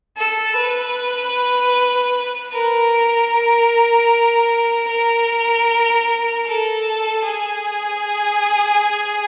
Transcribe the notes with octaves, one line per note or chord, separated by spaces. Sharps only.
A4
B4
A#4
A#4
A#4
A4
G#4